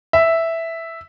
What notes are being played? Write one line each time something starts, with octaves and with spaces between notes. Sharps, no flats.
E5